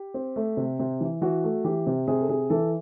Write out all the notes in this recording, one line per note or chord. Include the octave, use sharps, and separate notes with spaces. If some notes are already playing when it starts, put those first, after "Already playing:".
Already playing: G4
C4
A3
C3
C3
E3
E3 F#4
A3
E3 G4
C3
C3 G#4
A4
C3 G#4
E3 A4